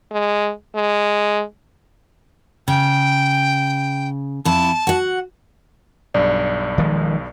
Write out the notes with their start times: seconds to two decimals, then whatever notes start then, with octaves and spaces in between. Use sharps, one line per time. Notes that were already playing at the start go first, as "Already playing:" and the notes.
0.11 G#3
0.76 G#3
2.68 C#3 G5
4.45 F2 E4 A5
4.87 F#4 F#5
6.14 B1 G2 D5
6.78 D#3 F3 G#3